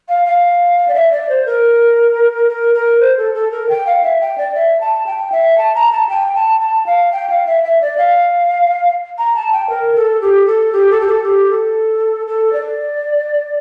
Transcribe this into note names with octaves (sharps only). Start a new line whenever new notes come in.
F5
F5
D5
E5
D5
C5
A#4
A#4
A#4
C5
A4
A4
A#4
G5
F5
E5
G5
D5
E5
A5
G5
E5
A5
A#5
A5
G5
A5
A5
F5
G5
F5
E5
E5
D5
F5
A#5
A5
G5
A#4
A4
G4
A4
G4
A4
G4
A4
G4
A4
A4
D5